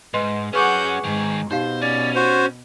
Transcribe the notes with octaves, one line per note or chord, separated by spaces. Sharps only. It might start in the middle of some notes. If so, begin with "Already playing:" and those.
G#2 B4 D#5 C6
C#4 F#4 G#4 B4 F#5 C#6 D6 G6
G#2 D#3 G#4
B2 D#4 G4 C5 F5
C#4 D5
F#4 C5